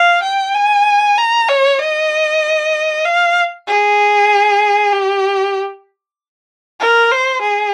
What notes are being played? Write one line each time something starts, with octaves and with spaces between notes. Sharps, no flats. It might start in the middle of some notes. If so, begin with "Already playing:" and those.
Already playing: F5
G5
G#5
A#5
C#5
D#5
F5
G#4
G4
A#4
C5
G#4